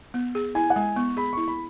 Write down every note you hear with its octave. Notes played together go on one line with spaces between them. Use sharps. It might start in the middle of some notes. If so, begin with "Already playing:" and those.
B3
G#4
E4 G#5
F#5
G#3 G#5
B3 C#6
G#4 B5
E4 C#6
B5